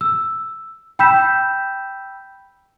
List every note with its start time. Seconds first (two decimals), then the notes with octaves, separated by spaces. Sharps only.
0.01 E6
0.99 G5 B5 E6 G6 B6 E7